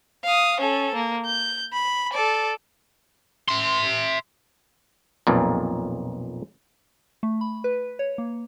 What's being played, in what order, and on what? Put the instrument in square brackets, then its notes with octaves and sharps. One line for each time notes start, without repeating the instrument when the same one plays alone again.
[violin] F5 D#6
C#4 A4
A#3
G6
B5
A4 D5
[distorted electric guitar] E5 C6
[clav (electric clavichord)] B1 F2 A#2
[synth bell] A3
B5
B4
C#5
A#3